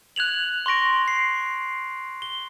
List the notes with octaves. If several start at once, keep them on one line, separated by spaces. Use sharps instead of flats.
F#6 G#6 F7 F#7
C6 C#6 A#6 D7
C7
G7